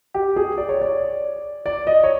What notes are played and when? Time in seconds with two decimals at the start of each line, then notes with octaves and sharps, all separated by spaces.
0.14 G4
0.36 G#4
0.58 D5
0.69 C#5
0.82 D5
1.66 D5
1.87 D#5
2.04 C#5